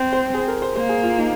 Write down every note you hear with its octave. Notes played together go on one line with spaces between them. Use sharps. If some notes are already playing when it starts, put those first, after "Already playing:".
Already playing: C4
C5
G#4
A#4
C5
A#3 C5
G#4
F4
D#4